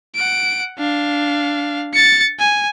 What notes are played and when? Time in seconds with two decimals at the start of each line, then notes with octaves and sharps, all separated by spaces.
0.15 F#5 D7
0.79 D4 F5
1.93 A6 C#7
2.39 G#5